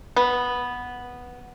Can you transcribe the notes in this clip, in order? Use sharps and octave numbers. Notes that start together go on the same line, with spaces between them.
B3